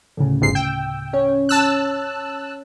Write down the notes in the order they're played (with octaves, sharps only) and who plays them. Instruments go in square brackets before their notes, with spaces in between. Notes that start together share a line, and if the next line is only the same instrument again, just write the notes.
[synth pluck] D2 A2 C#3
[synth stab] G1 G#2 C7
[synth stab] G5 [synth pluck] E6
[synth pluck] C#4 C#5
[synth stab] A5 E6 F#6